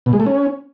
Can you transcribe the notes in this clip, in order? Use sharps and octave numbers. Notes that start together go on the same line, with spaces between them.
B2
G#3
A3
C#4